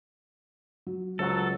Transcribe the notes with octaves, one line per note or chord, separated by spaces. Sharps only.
F#3
C#2 F#3 A4 C5 F#5 A5